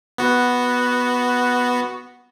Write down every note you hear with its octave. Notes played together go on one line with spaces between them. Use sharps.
B3 F#4